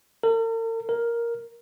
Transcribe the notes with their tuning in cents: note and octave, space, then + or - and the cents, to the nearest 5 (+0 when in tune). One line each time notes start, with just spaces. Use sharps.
A#4 -45
A#4 +5